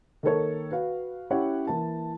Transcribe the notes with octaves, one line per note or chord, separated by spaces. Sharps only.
D#3 A#3 A4 C#5
F#4 B4 F5
C#4 E4 G4 C#5 F#5
E3 A#3 A5